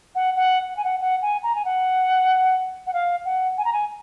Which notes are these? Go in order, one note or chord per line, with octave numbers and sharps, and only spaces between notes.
F#5
F#5
F#5
G#5
F#5
F#5
G#5
A#5
G#5
F#5
F#5
F5
F#5
G#5
A#5
G#5